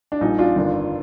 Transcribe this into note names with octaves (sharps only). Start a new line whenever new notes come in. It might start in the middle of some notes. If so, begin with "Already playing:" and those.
D4
A#1 A#2 G3 D#4
D4 F4
G1 F2 D#3